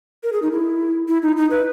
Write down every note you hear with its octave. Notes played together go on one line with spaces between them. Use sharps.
A#4
G#4
D#4
E4
E4
D#4
D#4
B4